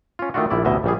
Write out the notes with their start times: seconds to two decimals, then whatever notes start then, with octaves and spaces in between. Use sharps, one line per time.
0.19 C#4 F4
0.34 D#3 A3 D4 F4 F#4
0.50 A#1 E4 D5
0.65 A1 D2 B2 D#5 E5
0.84 A#1 G3 G#4